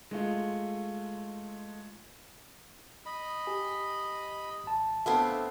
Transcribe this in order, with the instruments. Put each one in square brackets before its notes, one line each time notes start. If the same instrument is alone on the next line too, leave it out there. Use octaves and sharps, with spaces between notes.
[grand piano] G#3 A3 F4
[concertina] D#5 B5
[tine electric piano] G4 G#5
G#1 A5
[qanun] A3 B3 C4 [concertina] D4 F5